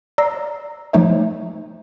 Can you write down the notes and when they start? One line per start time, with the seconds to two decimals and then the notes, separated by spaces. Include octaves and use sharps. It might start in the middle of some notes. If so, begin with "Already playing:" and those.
0.18 D5 A#5 E6 A#6 C7
0.93 F3 A3 D#4 C#5 E5